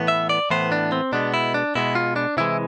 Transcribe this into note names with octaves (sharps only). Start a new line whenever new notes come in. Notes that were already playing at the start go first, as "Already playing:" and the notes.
Already playing: A2 E3 B3
E5
D5
A2 E3 B3 C5
D4
C4
B2 G#3 B3 D4
E4
D4
B2 G#3 B3 E4
F4
D4
C3 E3 G#3 E4